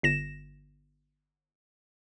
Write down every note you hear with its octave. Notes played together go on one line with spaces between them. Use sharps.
G1 A#6 E7